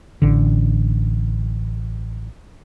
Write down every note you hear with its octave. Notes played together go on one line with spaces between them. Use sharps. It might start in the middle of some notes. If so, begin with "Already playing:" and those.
A1 D3